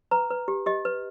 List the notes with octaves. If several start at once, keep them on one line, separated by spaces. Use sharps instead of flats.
B4 A#5
B4
G4
G4 D#5
B4